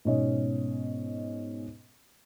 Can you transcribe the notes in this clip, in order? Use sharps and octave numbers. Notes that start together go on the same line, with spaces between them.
G#2 B2 C#4 D#5